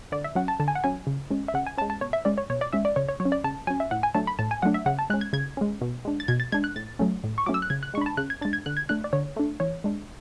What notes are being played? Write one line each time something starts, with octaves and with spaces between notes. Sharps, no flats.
D3 D5
E5
F#3 C#4 F#5
A5
D3 A5
G#5
F#5
F#3 C#4 G#5
C#3
G#3 C#4
E5
C#3 F#5
G#5
G#3 C#4 A5
A5
B2 C#5
E5
G#3 C#4 D5
C#5
B2 C#5
D5
G#3 C#4 E5
D5
C#3 C#5
C#5
F#3 C#5
C#4
D5
C#3 A5
F#3 C#4 G#5
E5
A2 F#5
G#5
F#3 A3 D4 A5
B5
A2 A5
G#5
F#3 A3 D4 F#5
E5
C#3 F#5
A5
G#3 C#4 F#6
G#6
C#3 G#6
G#3 C#4
B2
G#3 D4
A6
B2 G#6
A6
G#3 D4 G#6
F#6
A2 A6
F#3 A3 C#4
A2
C#6
F#3 A3 C#4 D6
E6
F#6
C#3 G#6
F#6
G#3 D4 B5 C#6
A5
C#3 F#6
G#6
G#3 D4 A6
G#6
D3 F#6
G#6
A3 D4 F#6
D5
D3 C#5
A3 D4
E3 C#5
G#3 D4